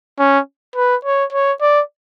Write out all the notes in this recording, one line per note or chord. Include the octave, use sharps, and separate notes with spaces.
C#4
B4
C#5
C#5
D5